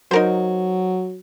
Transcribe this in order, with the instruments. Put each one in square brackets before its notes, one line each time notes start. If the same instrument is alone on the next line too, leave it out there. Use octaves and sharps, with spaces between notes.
[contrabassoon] F#3 [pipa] D#4 A#4 C5